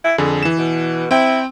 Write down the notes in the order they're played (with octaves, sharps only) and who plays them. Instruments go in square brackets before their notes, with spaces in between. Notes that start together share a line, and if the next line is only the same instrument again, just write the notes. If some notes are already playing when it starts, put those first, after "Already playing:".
[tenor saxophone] E4
[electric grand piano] F2 D3 [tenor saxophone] G#4
[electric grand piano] E3 E7
[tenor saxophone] B2
[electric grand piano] C4 G5 [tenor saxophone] E4